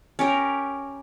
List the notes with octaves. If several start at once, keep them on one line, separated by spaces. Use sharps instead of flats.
C#4 G4 A#4